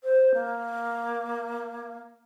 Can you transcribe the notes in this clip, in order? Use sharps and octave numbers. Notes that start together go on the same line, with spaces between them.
C5
A#3